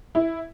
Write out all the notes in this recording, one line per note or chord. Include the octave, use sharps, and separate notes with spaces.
E4